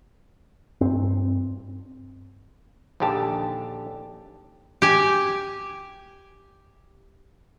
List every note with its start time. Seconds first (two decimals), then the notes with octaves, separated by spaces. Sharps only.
0.81 G2 C4
3.00 A#1 D#2 D3 G4 A5
4.82 G4 G#5